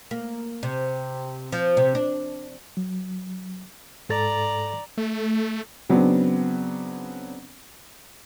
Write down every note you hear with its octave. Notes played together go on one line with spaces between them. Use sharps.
A#3
C3
F3
C3
D4
F#3
G#2 A4 D5 A#5 A6
A3
C#3 F#3 B3 C4 D4